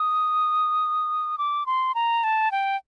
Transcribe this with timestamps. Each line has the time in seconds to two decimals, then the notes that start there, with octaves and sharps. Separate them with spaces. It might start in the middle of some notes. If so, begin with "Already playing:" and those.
Already playing: D#6
1.38 D6
1.66 C6
1.95 A#5
2.24 A5
2.52 G5